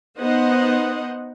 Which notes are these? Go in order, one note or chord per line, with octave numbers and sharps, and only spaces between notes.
B3 D#4 C5 D#5 F#5